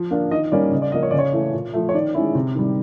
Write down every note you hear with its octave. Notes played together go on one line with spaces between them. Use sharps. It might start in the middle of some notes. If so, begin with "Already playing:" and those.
Already playing: F3
A#3 D4 F4
D#3 D#5
G3 A#3 C#4 D5
C#3 D#5
D5
F3 A#3 D#5
C#5
C#3 D5
C#5
E3 A3
A#2
F3 A3
C#5
D#3 D5
G#3 C#4 E4
C3
D#3 G3